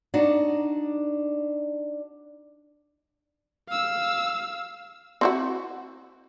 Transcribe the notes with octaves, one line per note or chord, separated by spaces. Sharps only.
D4 D#4 F#4
F5 E6
C4 E4 F#4